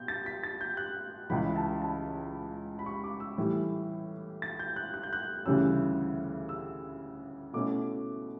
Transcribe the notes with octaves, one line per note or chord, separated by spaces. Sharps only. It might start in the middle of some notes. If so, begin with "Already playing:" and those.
Already playing: B2 G6
A6
B6
A6
G6
F#6
C#2 C#3 E3 B5
A5
A5
B5
C#6
D6
E6
A2 E3 G3
A6
G6
F#6
F#6
G6
F#6
D2 C#3 E3 G3 C#4 E6
E6
B2 A3 C#4 E4 D6